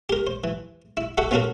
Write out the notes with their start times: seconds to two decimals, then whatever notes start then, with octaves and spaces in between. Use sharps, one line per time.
0.09 G4 A#4
0.27 C5
0.44 E3
0.97 E4
1.18 F#4 A4 E5 F#5 G5
1.31 B3 C#4 F4 F#4 A4 A#4